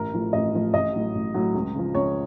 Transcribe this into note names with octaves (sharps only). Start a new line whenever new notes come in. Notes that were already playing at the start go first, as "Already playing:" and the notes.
Already playing: A1 A#4
A2 F3
A1 D#5
A2 F3
A1 D#5
A2 F#3
A1
A2 F#3
C#2
C#3 F3
C#2 C#5